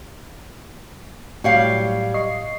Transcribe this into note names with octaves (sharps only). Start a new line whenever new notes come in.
A2 F#3 G3 C#5 F5
D#5 C#6 C7